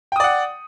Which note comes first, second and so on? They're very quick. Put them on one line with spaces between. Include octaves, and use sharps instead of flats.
G5 D#6 D5 F#5